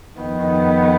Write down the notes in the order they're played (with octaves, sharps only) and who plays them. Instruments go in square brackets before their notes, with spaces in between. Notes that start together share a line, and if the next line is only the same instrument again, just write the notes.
[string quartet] F2 D#3 B3